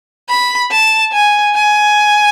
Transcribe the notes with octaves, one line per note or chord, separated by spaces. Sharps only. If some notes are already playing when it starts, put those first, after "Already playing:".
B5
A5
G#5
G#5